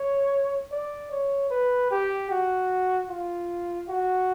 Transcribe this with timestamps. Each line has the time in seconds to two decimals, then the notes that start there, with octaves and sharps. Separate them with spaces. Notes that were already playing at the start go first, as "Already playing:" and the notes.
Already playing: C#5
0.72 D5
1.12 C#5
1.50 B4
1.91 G4
2.30 F#4
3.10 F4
3.89 F#4